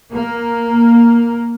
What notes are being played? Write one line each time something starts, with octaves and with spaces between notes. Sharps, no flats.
A#3